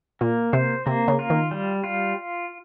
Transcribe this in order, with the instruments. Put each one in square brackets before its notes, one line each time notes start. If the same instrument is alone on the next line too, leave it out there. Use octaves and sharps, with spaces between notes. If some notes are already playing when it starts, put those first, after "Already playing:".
[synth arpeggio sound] A#2 [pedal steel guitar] A#3
[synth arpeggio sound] C3 [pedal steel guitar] C5
[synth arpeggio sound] C3 [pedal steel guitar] A#3
[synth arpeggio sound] C#3
[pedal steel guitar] F4
[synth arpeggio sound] D#3
[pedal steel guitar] G3
F4